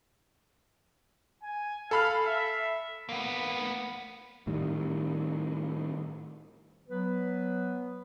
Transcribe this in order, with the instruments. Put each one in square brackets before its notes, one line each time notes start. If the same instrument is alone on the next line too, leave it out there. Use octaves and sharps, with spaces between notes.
[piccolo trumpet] G#5
[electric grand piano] A4 B5 F6 [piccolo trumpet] F5
[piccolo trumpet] E5
[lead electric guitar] A#3 B3
[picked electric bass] A2 D#3 G3
[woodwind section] F#3 B3 B4